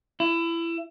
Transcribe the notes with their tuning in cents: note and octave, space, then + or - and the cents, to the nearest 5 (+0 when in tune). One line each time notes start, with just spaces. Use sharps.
E4 +25